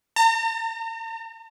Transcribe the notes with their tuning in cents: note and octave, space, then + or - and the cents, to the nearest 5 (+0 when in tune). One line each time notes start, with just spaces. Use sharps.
A#5 -45